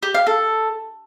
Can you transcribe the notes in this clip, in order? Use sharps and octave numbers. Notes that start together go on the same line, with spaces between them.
G4
F5
A4